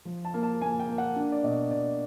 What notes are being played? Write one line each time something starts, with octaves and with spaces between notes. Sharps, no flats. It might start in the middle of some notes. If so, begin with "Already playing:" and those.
F3
A5
A#3
A5
A#3 G#5
G5
A#3
F#5
D4
D5
B2 D#5
B2 D5